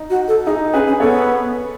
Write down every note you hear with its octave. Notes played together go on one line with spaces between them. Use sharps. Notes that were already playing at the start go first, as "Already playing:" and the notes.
Already playing: D#4
F#4
A4
D#4 G#4
C#4 G#4 B4
C#4
B3 A4 C#5